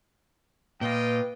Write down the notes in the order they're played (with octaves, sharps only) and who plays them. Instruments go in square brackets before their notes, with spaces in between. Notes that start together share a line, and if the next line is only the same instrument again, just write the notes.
[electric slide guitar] A#2 [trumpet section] F4 D#5 G5 [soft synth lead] B4